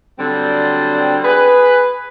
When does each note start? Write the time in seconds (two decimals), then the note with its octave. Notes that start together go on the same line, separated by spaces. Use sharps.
0.19 D3 F#3 G3 C4
1.23 G#4 B4